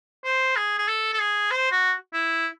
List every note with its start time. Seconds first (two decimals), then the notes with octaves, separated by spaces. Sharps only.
0.25 C5
0.56 G#4
0.79 G#4
0.88 A4
1.13 A4
1.20 G#4
1.51 C5
1.71 F#4
2.13 E4